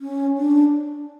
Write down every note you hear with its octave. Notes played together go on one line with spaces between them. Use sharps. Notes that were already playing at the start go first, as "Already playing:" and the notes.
C#4
D4